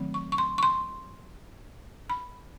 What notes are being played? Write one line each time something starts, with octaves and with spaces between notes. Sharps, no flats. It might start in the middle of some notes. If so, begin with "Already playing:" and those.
Already playing: D#3 F#3 A3 C4
C#6
C#6
C6
C#6
C6
B5